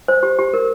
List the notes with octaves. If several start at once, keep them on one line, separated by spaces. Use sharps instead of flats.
C5
G4
G4
A#4